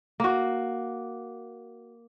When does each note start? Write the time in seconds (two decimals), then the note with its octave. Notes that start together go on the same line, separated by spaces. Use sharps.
0.20 A#3 F#4